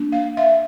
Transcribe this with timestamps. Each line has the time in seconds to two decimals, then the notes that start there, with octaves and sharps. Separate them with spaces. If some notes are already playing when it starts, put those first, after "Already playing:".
Already playing: A#3 D4
0.12 F5
0.37 E5